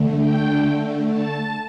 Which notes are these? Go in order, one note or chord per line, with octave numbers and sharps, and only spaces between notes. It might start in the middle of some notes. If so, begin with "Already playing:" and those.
Already playing: D3 A3
G5
A5